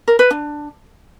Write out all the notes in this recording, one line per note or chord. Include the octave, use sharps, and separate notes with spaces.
A#4
B4
D4